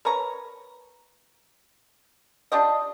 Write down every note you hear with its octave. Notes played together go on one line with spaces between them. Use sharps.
A#4 B4 C#5 A#5
D4 F4 G4 D#5